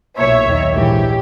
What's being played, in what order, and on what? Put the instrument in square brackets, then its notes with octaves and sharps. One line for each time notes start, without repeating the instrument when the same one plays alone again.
[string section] B1 A#2 C#5 E5
D#2 D#3
A#1 G#2 E3 G4